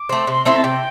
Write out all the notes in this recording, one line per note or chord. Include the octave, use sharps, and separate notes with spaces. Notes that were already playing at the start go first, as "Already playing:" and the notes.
Already playing: D6
A3 C4
C3 C6
A3 C4 E4 C6
A5
C3 G5